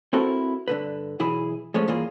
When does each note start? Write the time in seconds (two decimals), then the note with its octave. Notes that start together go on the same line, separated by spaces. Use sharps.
0.13 C4 E4 F#4 A4 A#4
0.68 G2 D3 B4
1.19 B1 E3 E4 G#4 B5
1.74 F3 G#3 A3 C#4
1.88 G2 E3 A#3 F4 G#4